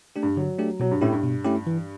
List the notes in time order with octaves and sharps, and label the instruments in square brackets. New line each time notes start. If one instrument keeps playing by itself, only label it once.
[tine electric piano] A3 D4 G4
[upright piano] G2
[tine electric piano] D3 [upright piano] F#3
[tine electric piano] A3 D4 G4
[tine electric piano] B2 [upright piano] F#3
[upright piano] G2
[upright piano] A2 [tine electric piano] A3 C#4 E4 G4
[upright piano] G2
[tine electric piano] B2
A3 C#4 E4 G4
E3